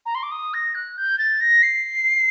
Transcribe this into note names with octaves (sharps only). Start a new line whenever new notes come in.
A#5
C6
D6
D#6
A#6
F#6
G6
A6
A#6
C7